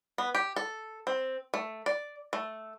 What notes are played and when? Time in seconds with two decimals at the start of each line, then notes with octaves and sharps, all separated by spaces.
0.18 B3
0.35 G4
0.56 A4
1.07 C4
1.54 A3
1.86 D5
2.33 A3